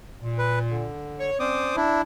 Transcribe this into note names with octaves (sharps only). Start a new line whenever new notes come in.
A#2
B4
D3
C#5
C4 C#4 C5 D5 D6 D#6
D4 E4